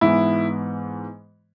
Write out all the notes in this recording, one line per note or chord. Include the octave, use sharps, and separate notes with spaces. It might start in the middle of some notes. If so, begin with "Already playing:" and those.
G#2 E3 B3 E4